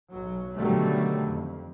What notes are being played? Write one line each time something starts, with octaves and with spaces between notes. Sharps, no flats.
B1 F#3
B2 D3 D#3 F#3 G3 A3
F2